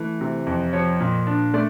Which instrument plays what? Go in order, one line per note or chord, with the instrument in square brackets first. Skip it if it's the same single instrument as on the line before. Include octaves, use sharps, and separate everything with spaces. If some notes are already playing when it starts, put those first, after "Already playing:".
Already playing: [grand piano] E3 A3
C3
F2
F3 C#5
A#2
D4
A3 D5